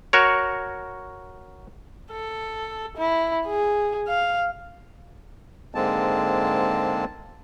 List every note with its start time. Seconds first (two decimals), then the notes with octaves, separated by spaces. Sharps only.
0.13 F#4 A#4 C#5
2.12 A4
2.98 E4
3.47 G#4
4.08 F5
5.75 G#2 D3 G#3 A#3 C4 A5